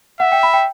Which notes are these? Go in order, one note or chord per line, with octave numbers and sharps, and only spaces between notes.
E5 F#5
G5
B5
G5